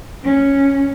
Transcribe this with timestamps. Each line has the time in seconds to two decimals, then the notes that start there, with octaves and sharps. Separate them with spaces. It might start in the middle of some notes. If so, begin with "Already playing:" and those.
0.23 C#4